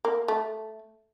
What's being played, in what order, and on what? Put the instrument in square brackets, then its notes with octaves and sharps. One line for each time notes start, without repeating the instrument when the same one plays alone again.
[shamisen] A#3
A3